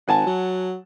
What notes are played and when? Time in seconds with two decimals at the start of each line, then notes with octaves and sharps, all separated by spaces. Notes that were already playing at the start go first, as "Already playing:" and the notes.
0.08 G#1 F#5 G#5 A5
0.27 F#3